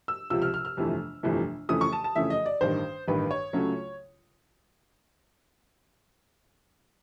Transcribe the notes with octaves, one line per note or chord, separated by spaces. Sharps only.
E6
C#2 C3 F3 E6
F6
F6
F6
G1 F2 C3 E3 A3
G1 F2 C3 E3 A3
F2 C#3 E3 A3 D#6
C#6
A5
A5
F2 C#3 E3 A3 E5
D#5
D5
A1 G2 D#3 C5
A1 G2 D#3 B4
C#5
C#2 C#3 F#3 A3